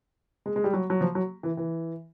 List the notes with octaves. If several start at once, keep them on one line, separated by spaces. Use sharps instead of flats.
G#3
G#3
G3
F#3
F#3
F3
F#3
E3
E3